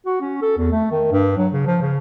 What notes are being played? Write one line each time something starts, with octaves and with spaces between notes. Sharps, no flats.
F#4
C#4
A4
E2
A3
D#3
G2
F#3
C#3
F3
C#3